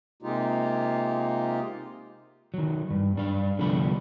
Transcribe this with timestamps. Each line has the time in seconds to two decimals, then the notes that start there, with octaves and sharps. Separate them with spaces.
0.22 C3 G#3 A#3 D#4 F4 G4
2.54 D#3 F#3
2.90 G2
3.16 G2 D4 F5
3.59 C2 D3 F3 G3 B3 B5